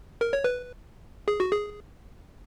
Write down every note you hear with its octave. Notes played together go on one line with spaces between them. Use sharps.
A#4
C#5
B4
G#4
F#4
G#4